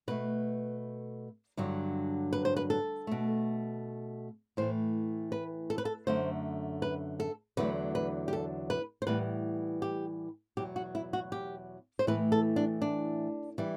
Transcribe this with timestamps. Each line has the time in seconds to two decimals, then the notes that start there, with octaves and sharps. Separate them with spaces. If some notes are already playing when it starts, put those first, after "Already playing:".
0.08 B2 A3 B4
1.57 G2 D3 F#3
2.33 B4
2.45 C5
2.57 B4
2.70 A4
3.07 B2 A3
4.57 A2 E3 A3 C5
5.32 B4
5.70 A4
5.78 B4
5.85 A4
6.07 F#2 D3 A3 C5
6.82 B4
7.20 A4
7.57 E2 D3 F#3 A3 B4
7.95 B4
8.28 G4
8.33 A4
8.70 B4
9.02 C5
9.07 A2 E3 G3 B3 B4
9.82 G4
10.57 E2 B2 F#3 G4
10.76 F#4
10.95 E4
11.13 F#4
11.32 G4
11.99 C5
12.07 A2 E3 A3 B4
12.32 A4
12.56 D4
12.82 D4
13.58 E3 G3